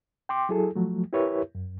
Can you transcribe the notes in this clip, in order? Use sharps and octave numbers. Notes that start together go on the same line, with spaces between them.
G5 C6 D6
F#3 E4 G#4 A4
F3 F#3 A3
E4 G4 A#4 B4 C#5 E5
F#2